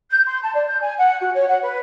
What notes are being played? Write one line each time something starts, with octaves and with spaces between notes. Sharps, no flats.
G6
C6
A5
D5
G6
G#5
F#5
F#4
C#5
F#5
B4